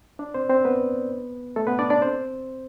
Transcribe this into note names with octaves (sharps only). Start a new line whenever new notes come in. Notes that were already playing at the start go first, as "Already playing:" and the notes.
D4 D5
C4 C5
C4 C5
B3 B4
A3 A4
B3 B4
D4 D5
D4 D5
C4 C5